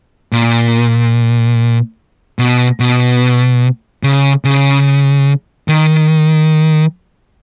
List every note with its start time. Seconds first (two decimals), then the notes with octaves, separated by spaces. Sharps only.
0.32 A#2
2.39 B2
2.80 B2
4.03 C#3
4.45 C#3
5.68 D#3